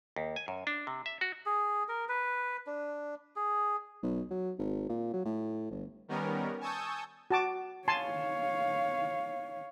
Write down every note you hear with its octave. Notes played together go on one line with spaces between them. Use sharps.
D#2
G#5
F#2
D4
C3
E5
F#4
G#4
A#4
B4
D4
G#4
B1
F#3
G#1
A#2
F#3
A2
G1
D#3 G3 B3 C#4 A#4
G#5 A5 C#6 D#6 E6 G6
F#4 A5 D6
C#5 F5 G#5 A5 C6